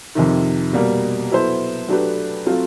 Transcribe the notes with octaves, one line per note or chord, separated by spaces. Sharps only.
F2 C3 D#3
B2 G3 A#3
F#3 B3 E4 A4 C5
F#3 A3 D4 G4 B4
F#3 A3 C4 F4